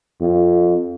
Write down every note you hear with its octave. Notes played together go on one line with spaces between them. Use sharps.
F2